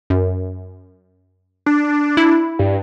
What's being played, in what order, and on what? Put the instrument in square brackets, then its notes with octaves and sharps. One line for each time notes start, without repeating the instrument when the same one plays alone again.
[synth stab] F#2
[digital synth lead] D4
[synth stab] E4
[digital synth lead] G2